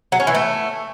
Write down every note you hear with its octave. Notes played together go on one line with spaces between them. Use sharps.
F#3
C#4
E3
A3